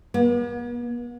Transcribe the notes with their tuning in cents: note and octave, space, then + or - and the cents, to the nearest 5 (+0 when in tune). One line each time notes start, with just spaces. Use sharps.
B3 -45